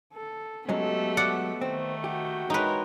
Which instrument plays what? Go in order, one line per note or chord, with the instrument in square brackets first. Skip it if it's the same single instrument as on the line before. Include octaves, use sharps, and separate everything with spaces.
[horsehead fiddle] A4
[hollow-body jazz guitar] F#3 G#3 C#4 [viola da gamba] A3 G4 A4 [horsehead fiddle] B3
[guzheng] D5 F#5
[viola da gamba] D#3 A3 [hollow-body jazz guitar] C4
[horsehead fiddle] F#4 G5 [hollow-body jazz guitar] G4
[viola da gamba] G#3 A#4 C#5 [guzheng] D#4 B4